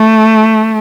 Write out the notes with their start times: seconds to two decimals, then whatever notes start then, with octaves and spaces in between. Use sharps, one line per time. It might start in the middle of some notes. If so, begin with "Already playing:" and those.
Already playing: A3